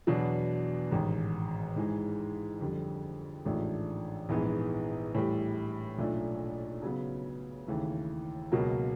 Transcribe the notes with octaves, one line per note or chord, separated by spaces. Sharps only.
E2 B2 F#3 B3 D4
A1 G#2 D#3
G#2 E3 G#3
F2 D3 G3
A1 G#2 F3 A3 D4
A#1 G#2 E3 G#3 B3
A2 E3 G3
B1 A#2 F3 A3 D4
C#3 F#3 B3
D#2 C#3 E3 A3
C#2 B2 F#3 A#3